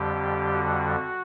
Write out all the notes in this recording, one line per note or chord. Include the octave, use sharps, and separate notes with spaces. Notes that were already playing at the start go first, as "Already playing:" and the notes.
Already playing: F2 D3 G3 G4
F#4